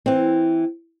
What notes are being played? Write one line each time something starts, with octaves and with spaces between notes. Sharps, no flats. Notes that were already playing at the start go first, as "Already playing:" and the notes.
E3 C4